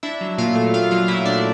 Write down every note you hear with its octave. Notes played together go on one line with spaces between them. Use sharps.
D4 E4 E5
F#3
A#2 F4 F5
A3
D4 F4 F5
F#3 F4 F5
A#2 E4 E5
A3 D4 D5